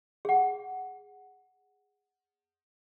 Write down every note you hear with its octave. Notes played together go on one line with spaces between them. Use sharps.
G#4 F#5